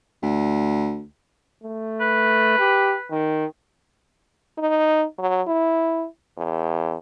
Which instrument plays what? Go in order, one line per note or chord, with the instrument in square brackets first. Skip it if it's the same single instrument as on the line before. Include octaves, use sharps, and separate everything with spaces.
[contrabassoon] D2
[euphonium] A3
[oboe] B4
[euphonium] G4
D#3
[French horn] D#4
F#3
E4
E2